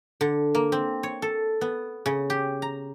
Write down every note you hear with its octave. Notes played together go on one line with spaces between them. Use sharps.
D3
A#3
C4
C#5
A4
B3
C#3
G4
A#5